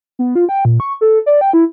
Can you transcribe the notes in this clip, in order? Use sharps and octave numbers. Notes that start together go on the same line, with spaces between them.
B3
F4
G5
A#2
C#6
A4
D5
G5
E4